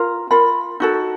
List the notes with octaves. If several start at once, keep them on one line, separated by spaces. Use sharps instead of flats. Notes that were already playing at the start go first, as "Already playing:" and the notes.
Already playing: F4 A#4
F4 A#4 B5
D#4 F#4 A4